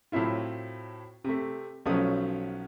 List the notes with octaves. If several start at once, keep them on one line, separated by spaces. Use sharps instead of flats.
A2 F#3 C4 E4 F4
C3 A3
B1 F3 F#3 A3 C#4 D#6